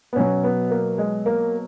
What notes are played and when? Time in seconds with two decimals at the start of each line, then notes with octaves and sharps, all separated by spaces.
0.13 B3
0.16 B2 F#3 C#4
0.44 B3
0.71 A#3
0.98 G#3
1.26 A#3